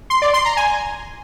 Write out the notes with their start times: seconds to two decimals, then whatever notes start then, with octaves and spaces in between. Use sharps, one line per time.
0.10 C6
0.22 D5
0.34 C6
0.45 A#5
0.57 G#5